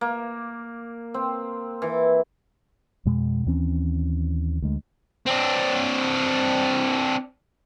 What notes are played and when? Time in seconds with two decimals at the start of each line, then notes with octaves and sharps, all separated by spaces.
0.01 A#3
1.14 C4
1.82 E3
3.05 F2 B2 G#3
3.46 D#2 E3 C4 C#4
4.62 D2 G#3
5.26 C4 D4